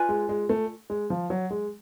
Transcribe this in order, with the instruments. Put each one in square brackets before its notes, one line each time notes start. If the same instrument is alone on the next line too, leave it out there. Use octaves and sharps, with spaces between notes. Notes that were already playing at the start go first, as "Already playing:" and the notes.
Already playing: [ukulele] F4 B4 D5 G#5
[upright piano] G#3
G#3
A3
G#3
F3
F#3
G#3